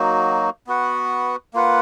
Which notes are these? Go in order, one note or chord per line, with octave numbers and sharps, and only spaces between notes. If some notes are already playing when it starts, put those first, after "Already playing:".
Already playing: F#3 A#3 D#4 F#4
B3 F#4 B4 F#5
A#3 F4 B4 F#5